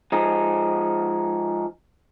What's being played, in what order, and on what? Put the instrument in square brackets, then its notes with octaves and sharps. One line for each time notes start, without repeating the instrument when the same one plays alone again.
[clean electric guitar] F3 G#3 D#4